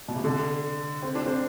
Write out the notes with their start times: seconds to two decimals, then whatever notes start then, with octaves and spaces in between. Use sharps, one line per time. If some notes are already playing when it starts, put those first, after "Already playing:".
0.08 B2
0.16 C3
0.24 D3
1.02 C4
1.15 D4
1.26 C4